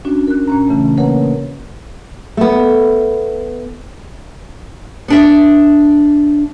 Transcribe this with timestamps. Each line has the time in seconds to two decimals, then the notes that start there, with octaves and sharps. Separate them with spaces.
0.05 C#4 D4 F#4
0.27 A#4 F#6
0.47 A#2 C#4 A#5
0.68 C#3 E3 A3
0.97 A#3 A#4 B4 C#5 F#5
2.37 A3 B3
5.08 B3 D4 E5